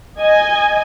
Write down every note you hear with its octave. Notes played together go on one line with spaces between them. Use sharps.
D#5 G#5